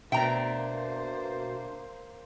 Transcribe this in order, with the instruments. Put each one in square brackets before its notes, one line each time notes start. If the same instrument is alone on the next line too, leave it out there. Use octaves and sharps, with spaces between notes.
[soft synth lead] B2 [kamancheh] A#3 C5 [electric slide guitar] D4 E5 [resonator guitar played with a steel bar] G5 A#5